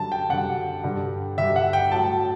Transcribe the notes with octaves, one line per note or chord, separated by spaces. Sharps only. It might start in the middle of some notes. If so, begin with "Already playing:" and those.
Already playing: F#2 D3 G3 A5
G5
F#2 D3 G3 F#5
G2 D3 G3
G2 D3 G3 E5
F#5
G5
A2 F#3 A5